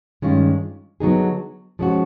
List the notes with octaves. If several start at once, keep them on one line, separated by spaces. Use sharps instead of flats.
G2 D#3 G#3 C#4 F4
D3 F#3 B3 D#4 G#4
F3 G#3 C#4 F#4